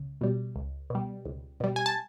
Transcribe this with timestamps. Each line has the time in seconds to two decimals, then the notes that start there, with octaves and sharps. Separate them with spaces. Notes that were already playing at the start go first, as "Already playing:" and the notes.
Already playing: C#2
0.21 B2 G3
0.56 C#2
0.90 B2 G3
1.26 C#2
1.60 B2 G3
1.76 G#5
1.86 A5